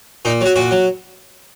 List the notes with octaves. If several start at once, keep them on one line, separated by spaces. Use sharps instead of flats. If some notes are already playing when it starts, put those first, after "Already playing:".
A#2 D#4
F#3 F#4
A#2 F#4
F#3